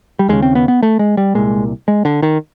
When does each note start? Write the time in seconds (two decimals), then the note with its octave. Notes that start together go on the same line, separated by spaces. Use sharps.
0.19 G3
0.28 D#2 C#3 G#3
0.42 C4
0.55 B3
0.68 B3
0.83 A3
0.99 G#3
1.17 G3
1.35 C2 A#2 G#3
1.88 G#3
2.05 D3
2.22 D#3